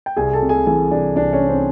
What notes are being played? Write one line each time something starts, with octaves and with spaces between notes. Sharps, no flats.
G5
C2 G#4 G#5
A4 A5
C3
G#4 G#5
E3 G#4 G#5
C2 D4 D5
C2 D4 D5
C#4 C#5
C3
C4 C5